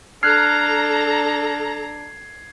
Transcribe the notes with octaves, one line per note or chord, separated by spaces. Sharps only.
D4 A4 A#5 F6 F#6 G#6 C7